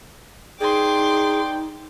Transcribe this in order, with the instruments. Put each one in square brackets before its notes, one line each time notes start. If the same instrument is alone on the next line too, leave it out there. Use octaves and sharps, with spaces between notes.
[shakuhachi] D#4 [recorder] G#4 [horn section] B4 D5 G5 [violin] C6 D6